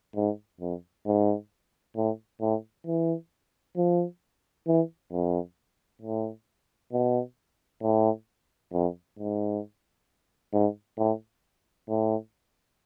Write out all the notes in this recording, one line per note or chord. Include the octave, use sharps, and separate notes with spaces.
G#2
F2
G#2
A2
A2
E3
F3
E3
F2
A2
B2
A2
F2
G#2
G#2
A2
A2